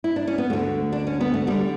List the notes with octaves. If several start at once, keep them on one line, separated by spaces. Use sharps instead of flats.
E4
D4
C#4
B3
D2 D3 A3
D4
C#4
B3
A3
D3 G3